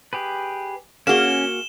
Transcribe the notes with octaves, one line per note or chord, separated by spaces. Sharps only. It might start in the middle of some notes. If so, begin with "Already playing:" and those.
G4 G#4 B4
A#3 C#4 F#4 G#4 F6 E7 G7